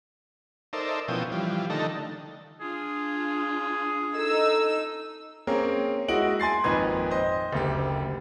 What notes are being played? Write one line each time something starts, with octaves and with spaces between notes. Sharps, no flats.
D#4 A4 A#4 C5 D5 E5
B2 F3 C#4 E4 G5 D#6
E3 F3 G3
D3 D#3 A3 D#4 A4 A#5
D4 F4 G#4
D#4 A4 E6
A#3 C4 C#4 G#4 A#4
G#3 E4 F#4 D#5 D7 F#7
G#5 C6 A6 C7
G#1 F2 A#2 D#4 B4 G#6
C5 D#5
F#1 D2 G4